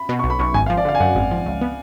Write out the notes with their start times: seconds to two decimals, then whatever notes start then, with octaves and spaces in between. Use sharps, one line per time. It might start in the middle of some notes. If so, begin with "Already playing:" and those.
Already playing: B5
0.09 B2
0.19 B1 C#6
0.30 B5
0.39 B1 C#6
0.54 G#1 G#5
0.66 F5
0.70 F3
0.77 D5
0.85 D3 F5
0.95 G#5
1.00 F#2 F#5
1.15 G#1
1.31 F3
1.46 C#2
1.61 B3